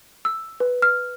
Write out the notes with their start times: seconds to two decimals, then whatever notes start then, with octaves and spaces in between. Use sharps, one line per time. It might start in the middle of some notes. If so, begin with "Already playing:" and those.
0.25 E6
0.60 B4
0.82 F6